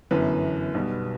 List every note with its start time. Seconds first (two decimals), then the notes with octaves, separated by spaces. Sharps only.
0.11 G1 F#2 E3 B3 B4
0.74 B1 B2 G3 B3